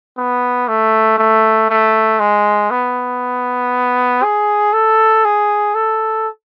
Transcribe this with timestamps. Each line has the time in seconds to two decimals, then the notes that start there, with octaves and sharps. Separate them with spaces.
0.17 B3
0.68 A3
1.18 A3
1.70 A3
2.19 G#3
2.71 B3
4.23 G#4
4.73 A4
5.25 G#4
5.75 A4